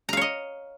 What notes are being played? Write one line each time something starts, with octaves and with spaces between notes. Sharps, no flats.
C#5 D#5 F5 A#5